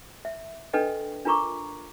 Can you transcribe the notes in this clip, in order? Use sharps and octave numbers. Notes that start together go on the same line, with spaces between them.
E5
D4 A4 B4 D#5 G5
D4 F4 A#4 A#5 C#6 D6